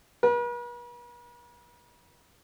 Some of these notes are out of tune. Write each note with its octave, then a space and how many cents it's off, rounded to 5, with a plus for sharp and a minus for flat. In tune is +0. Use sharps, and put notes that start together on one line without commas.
B4 -45